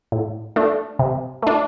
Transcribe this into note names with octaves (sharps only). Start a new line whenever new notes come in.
A2
A3 D4
C3
A3 D4